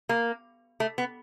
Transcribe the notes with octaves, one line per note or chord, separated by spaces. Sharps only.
A#3
A3
B3